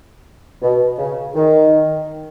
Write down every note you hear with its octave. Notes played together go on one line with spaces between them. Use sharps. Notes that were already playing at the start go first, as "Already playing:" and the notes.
B2
C#3
D#3